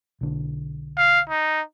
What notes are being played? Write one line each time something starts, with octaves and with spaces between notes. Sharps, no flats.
B1 D3
F5
D#4